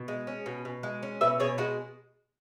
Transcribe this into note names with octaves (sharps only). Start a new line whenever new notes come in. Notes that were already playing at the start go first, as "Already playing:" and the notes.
Already playing: B2
G#3
C#4
B2
B2
G#3
C#4
B2 B4 E5
B2 G#4 C#5
G#3 F#4 B4